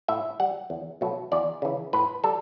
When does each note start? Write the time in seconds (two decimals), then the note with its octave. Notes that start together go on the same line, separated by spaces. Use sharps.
0.08 A2 E5
0.40 G3 F#5
0.70 E2
1.01 B2 F#3 A3
1.32 E2 D5
1.62 C#3 E3
1.93 A2 B4
2.24 G3 A4